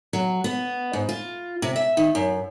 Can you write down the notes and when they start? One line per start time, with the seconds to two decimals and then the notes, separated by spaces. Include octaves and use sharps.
0.13 F#3
0.44 B3
0.93 G#2
1.09 F4
1.62 C3
1.76 E5
1.97 D#3
2.15 F#2